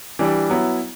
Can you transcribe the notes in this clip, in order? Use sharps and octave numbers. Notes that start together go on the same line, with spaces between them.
E3 G3 D4
F#3 B3 E4